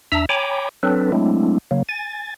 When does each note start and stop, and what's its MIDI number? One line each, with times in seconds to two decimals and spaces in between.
0.12 0.26 40
0.12 0.26 62
0.12 0.26 76
0.12 0.26 82
0.12 0.26 88
0.29 0.69 73
0.29 0.69 79
0.29 0.69 80
0.29 0.69 82
0.29 0.69 83
0.29 0.69 86
0.83 1.12 54
0.83 1.12 60
0.83 1.12 62
0.83 1.12 69
0.83 1.12 71
1.12 1.58 54
1.12 1.58 56
1.12 1.58 57
1.12 1.58 60
1.12 1.58 62
1.12 1.58 64
1.71 1.83 49
1.71 1.83 54
1.71 1.83 58
1.89 2.34 80
1.89 2.34 93